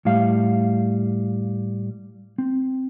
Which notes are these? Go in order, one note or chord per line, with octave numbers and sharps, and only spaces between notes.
A2 G3 F5
C4